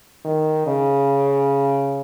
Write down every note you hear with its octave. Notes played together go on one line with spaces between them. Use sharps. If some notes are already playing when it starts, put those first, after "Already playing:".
D#3
C#3